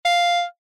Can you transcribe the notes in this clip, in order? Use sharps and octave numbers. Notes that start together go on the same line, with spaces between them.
F5